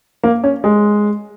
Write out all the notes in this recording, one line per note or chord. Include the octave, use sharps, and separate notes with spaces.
A#3
C#4
G#3